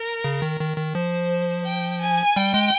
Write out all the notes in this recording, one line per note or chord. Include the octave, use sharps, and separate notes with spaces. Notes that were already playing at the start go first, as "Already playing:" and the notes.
Already playing: A#4
C#3
D#3
D#3
D#3
F3 C5
G5
G#5
G3 G5
G#3